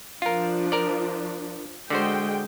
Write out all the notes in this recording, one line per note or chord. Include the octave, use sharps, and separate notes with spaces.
F3 D4 F4 A#4
A#4 D5
D3 G#3 F#4 C5 G5